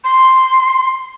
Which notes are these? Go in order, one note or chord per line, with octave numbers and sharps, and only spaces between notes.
C6